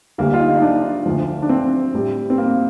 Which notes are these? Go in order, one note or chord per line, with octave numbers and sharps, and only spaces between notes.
D2 D3 G3 A#3
F4
D#4
D#4
D4
D2 D3 F3
D4
C4
A2 G3
C4
A#3